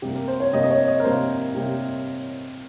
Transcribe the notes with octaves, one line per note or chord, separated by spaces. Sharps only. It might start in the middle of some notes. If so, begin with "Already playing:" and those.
C3 G3 A#3 G4
A#4
C5
C#5
C3 G3 A#3 D#5
D#5
C#5
D#5
A#4
C3 G3 A#3 C5
C3 G3 A#3